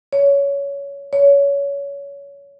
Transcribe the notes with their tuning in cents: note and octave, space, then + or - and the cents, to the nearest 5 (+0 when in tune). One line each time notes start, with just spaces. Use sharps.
C#5 +20
C#5 +25